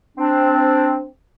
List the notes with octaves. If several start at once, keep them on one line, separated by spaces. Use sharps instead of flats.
C4 D4